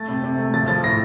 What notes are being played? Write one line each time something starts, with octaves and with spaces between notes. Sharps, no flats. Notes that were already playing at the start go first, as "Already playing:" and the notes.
Already playing: A3 A6
C3
C3
A3
F3 A6
F3 A6
A2 A#6